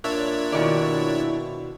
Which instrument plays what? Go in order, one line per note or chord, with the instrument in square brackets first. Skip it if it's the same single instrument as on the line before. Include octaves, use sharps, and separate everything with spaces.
[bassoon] A#2 [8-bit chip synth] D4 C#5 E5
[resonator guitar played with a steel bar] B2 D#3 D5 [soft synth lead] E4